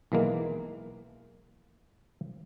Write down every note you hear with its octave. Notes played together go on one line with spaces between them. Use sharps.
B1 E3 G#3 A#3